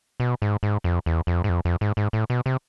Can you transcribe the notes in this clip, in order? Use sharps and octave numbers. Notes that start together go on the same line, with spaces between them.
B2
G#2
G#2
F2
E2
F2
G#2
F2
F2
G#2
G#2
A2
B2
C3